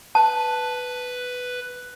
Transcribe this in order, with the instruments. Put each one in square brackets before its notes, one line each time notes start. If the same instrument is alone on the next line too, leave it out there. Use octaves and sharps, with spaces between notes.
[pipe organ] B4 [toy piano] A5